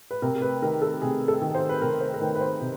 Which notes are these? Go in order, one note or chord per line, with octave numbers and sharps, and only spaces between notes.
B4
C3 A#4
A#4
B4
D#3 A#4
A4
C3 G#4
A4
D#3
C5
B4
C3 A#4
C5
A#4
D#3 B4
B4
C5
C3